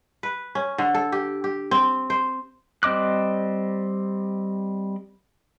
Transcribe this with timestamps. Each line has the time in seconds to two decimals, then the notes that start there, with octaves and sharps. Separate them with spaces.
0.23 B4
0.55 C#4
0.78 D3
0.94 A4
1.12 G4
1.44 G4
1.71 C4
2.10 C5
2.83 G3 C4 D#5 D6 F#6